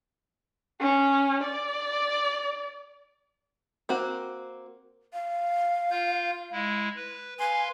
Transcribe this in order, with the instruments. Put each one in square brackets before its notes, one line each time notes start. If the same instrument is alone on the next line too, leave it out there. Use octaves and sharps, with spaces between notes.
[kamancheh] C#4
D5
[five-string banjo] A#3 C4 F#4
[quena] F5
[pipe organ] F4 G6
G#3 E4
B4
[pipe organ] B4 F5 C6 [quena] G#5